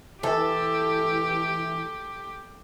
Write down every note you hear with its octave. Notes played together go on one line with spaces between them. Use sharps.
E3 G4 A4